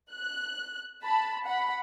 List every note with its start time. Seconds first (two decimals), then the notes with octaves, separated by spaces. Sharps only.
0.12 F#6
1.04 A5 B5
1.45 F#5 B5